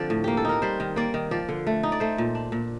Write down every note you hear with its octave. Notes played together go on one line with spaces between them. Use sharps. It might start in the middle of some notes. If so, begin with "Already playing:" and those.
Already playing: D3 F3 C4 D5
A2
A#3 G4
A4
D#4 A#4
G3 C5
D#3
A#3 D5
D#3
F3 D5
D3
A3
D#4
D5
A3 C5
A#2
D4
A#2